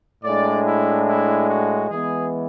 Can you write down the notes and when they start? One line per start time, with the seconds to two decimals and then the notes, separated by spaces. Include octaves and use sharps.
0.24 A2 G#3 D4 D5
0.66 E4
1.07 E4
1.49 F#4
1.90 E3 G#3 B3 G#4